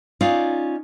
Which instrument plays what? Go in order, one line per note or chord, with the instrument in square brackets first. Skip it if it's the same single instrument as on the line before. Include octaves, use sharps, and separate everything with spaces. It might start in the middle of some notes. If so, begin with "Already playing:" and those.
[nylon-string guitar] C#4 D#4 F4 D5